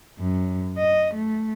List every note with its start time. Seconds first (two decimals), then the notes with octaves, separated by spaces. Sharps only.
0.20 F#2
0.78 D#5
1.14 A3